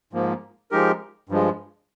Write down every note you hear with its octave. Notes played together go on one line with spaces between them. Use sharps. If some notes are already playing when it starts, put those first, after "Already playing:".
G#2 F3 A#3
F3 G#3 D#4 G4 A#4
G2 F3 G#3